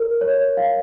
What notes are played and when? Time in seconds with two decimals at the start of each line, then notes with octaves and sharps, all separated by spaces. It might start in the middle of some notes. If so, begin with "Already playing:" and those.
Already playing: A#4
0.21 C#5
0.57 F5